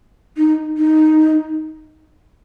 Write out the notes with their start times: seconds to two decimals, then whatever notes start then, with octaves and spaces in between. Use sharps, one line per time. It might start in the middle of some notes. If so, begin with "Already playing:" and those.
0.37 D#4
0.77 D#4